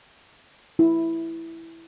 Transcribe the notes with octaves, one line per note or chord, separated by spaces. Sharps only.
E4